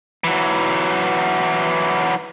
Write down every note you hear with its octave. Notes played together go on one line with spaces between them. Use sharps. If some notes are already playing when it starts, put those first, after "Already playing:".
E3 F#3